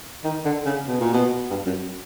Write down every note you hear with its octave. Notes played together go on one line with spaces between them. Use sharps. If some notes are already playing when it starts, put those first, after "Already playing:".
D#3
D3
C#3
B2
A#2
B2
G2
F#2